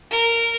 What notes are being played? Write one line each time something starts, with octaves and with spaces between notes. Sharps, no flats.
A#4